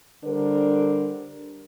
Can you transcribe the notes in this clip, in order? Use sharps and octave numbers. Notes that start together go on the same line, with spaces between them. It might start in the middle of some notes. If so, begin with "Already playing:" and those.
D3 G3 D4 A#4 C5